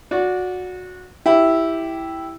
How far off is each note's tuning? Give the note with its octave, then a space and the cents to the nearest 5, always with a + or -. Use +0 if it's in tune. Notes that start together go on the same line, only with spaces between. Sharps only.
F#4 -20 D5 -15
E4 +0 G4 +0